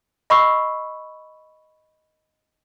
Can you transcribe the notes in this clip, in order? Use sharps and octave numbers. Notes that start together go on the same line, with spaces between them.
D#5 B5 C#6 E6 C7